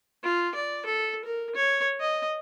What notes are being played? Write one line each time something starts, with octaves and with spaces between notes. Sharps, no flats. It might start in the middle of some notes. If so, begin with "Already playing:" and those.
F4
D5
A4
A#4
C#5
D#5